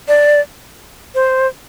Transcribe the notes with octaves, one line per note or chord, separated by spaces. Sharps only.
D5
C5